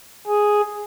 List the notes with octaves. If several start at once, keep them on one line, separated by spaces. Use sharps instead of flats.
G#4